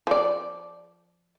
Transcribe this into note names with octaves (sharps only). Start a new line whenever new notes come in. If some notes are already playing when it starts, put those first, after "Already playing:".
F3 D5